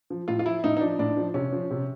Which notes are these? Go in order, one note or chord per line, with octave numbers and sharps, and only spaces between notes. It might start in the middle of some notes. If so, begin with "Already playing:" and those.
F3
A2 F4
F4
F3 E4
A2 D#4
D#4
F3 D4
A2 D4
F3
C3 C#4
F3
C3